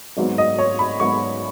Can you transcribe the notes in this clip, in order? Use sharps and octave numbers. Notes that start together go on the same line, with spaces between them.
G#1 G#2 F#3 B3
D#5
C#5
B5
G#1 G#2 F#3 B3 C#6